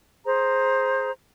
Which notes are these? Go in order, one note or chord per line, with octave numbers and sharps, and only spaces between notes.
G#4 C5 A#5